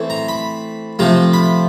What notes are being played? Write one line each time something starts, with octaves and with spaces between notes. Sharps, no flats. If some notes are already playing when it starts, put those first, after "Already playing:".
Already playing: E3 A3 C4
A#5
B5
C3 F3 A3 A#5
B5